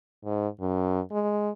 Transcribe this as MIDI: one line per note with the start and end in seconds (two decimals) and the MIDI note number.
0.25 0.48 44
0.61 1.00 42
1.12 1.50 56